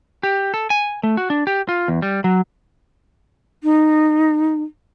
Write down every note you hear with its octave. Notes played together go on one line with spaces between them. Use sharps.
G4
A4
G#5
A3
F#4
D4
G4
F4
E2
G3
F#3
D#4